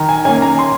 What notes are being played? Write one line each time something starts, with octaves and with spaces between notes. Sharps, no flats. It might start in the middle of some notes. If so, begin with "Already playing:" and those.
Already playing: D#3 A#5
G#5
A#3 C#4 G#5
A#5
C6